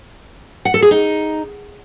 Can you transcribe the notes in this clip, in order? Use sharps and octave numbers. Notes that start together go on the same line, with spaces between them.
F#5
A4
G#4
D#4